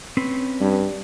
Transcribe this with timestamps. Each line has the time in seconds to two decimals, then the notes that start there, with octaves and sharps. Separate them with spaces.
0.17 C4 C#4 B4
0.61 G2